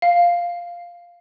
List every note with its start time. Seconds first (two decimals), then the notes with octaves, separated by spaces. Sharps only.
0.02 F5